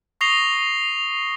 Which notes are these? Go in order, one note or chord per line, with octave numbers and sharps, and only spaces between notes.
C#6 D#6 A#6 C7 F7 G7